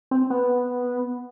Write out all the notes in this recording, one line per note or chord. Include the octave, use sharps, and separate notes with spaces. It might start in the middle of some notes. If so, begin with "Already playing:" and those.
C4
B3